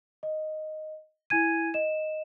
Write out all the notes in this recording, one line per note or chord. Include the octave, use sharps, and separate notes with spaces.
D#5
E4 G#5 G#6 D#7
D#5 E7